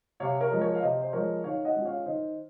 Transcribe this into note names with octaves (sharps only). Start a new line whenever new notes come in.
C3 C#5 F5
A#4 C#5
F3 G#3
A#4 C#5
F5
C3 C5 D#5
C5
F3 G#3 A#4 C#5
D#3 C#5 F5
D#5 F#5
G#3 C#4 F4
C#5 F5
D#3 C5 D#5